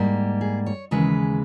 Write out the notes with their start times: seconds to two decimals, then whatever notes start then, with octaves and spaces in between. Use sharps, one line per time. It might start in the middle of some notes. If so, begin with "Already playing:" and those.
Already playing: G#2 G3 A#3
0.41 G#4
0.66 C#5
0.91 D#2 C#3 E3 G#3 B4